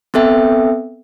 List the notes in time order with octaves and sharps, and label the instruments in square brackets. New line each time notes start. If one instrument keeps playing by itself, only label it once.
[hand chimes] B3 C4 A4 E5 G5